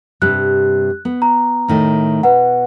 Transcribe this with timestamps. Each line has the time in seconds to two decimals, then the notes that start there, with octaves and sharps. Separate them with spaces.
0.22 G2 C3 G3 F#6
1.05 B3
1.22 A#5
1.68 A2 D#3 A3
2.23 B2 B4 F#5